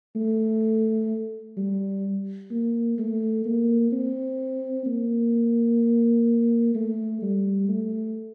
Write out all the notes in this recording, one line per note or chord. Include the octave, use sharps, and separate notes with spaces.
A3
G3
A#3
A3
A#3
C4
A#3
A3
G3
A3